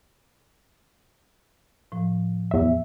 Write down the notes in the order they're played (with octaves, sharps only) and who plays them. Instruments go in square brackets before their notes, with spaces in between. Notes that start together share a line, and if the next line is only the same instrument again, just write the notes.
[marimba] A2 F3
[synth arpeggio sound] E2 E5